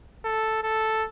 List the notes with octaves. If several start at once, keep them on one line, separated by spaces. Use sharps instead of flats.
A4
A4